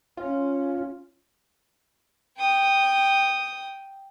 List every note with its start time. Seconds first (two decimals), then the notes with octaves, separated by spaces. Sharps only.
0.17 C#4 F4
2.38 G5 D#6